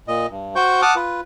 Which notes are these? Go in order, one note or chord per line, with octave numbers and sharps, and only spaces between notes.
A#2 D#5
G2
F#4 C5 G5 C#6 G6
F#5 A5 D6 D#6 F6
F4 B4